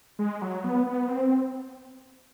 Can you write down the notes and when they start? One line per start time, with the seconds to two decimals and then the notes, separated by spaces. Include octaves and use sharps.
0.19 G#3
0.42 F#3
0.64 B3
0.87 B3
1.09 C4